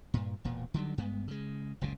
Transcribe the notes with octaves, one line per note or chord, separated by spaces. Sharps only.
G2 A#2
E1 A#2
D3 D#3 F#3 G3
G2 G#3 B3
C#3 G#3
F#1 C#2 A#2 C#3